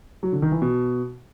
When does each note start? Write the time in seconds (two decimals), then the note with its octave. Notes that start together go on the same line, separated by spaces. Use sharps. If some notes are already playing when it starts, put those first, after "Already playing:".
0.23 F#3
0.33 D3
0.42 D#3
0.52 E3
0.62 B2